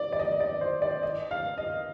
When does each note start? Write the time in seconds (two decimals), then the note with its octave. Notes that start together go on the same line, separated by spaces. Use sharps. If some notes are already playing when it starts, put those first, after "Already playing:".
Already playing: D5
0.13 D5
0.19 D#5
0.40 D5
0.61 C5
0.82 D5
1.03 D#5
1.31 F5
1.58 D#5